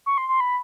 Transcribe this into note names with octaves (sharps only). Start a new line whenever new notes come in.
C#6
C6
C6
B5